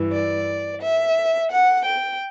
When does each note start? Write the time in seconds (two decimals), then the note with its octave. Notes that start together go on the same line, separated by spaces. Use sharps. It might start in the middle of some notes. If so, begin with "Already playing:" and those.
Already playing: G2 E3
0.12 D5
0.81 E5
1.51 F#5
1.85 G5